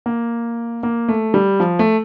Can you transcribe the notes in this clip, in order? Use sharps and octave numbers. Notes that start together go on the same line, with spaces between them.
A#3
A#3
A3
G3
F3
A3